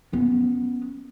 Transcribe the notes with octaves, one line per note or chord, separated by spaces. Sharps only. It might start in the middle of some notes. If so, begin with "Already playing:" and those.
B3 C#4